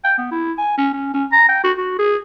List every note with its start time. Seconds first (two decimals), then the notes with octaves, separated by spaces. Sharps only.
0.04 G5
0.18 B3
0.31 E4
0.58 G#5
0.77 C#4
0.93 C#4
1.13 C#4
1.32 A#5
1.49 G5
1.64 F#4
1.77 F#4
1.99 G#4